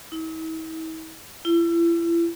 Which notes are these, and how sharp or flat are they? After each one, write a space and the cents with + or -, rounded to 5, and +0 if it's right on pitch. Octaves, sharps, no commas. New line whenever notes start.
E4 -45
E4 +35